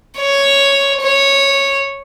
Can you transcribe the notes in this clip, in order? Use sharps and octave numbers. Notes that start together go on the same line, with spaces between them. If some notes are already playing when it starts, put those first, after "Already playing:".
C#5
C#5